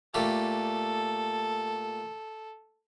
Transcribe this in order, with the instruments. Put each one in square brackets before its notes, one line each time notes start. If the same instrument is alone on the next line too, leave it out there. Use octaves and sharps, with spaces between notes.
[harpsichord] A#2 A3 G4 [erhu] A4